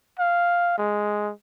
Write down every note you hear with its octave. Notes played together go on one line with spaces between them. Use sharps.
F5
G#3